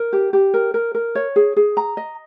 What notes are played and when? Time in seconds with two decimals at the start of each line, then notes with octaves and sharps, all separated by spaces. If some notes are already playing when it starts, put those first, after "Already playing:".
Already playing: A#4
0.13 G4
0.33 G4
0.54 A#4
0.74 A#4
0.95 A#4
1.15 C#5
1.36 G#4
1.57 G#4
1.77 A#5
1.97 D#5